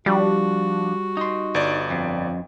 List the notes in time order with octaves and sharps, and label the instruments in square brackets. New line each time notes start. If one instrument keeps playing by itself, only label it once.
[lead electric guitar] F3 D4 [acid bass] G3 [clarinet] F#4
[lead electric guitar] D#4 C6
[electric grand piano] G1 D5
[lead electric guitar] F2